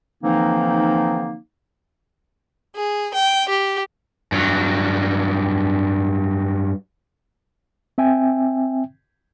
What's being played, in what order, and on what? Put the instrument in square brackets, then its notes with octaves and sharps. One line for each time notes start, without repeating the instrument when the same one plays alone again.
[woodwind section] D3 E3 F3 A#3 C4 D#4
[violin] G#4
G5
G4
[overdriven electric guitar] G2 F#3
[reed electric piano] C4 E5 G5 G#5